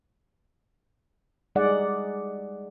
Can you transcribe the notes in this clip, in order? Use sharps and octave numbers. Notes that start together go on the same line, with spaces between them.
G3 G#3 D#4 G#4 D5 F#5